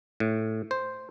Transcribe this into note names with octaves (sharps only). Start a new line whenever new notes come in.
A2
C5